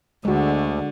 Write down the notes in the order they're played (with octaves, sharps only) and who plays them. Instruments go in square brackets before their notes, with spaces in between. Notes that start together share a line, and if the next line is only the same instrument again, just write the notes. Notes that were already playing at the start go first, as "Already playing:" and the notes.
[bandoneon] D2 [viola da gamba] D3 [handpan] G#3 F#4